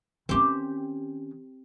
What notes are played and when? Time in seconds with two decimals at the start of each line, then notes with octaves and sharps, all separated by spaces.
0.29 D#3 C4 C#4 G4